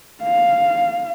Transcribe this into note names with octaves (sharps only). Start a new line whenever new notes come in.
F5